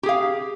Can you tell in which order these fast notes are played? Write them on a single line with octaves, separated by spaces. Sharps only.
G4 G#4 F5